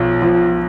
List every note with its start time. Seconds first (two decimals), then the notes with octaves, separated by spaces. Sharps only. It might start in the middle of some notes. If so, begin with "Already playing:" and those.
Already playing: B1 F3
0.22 F3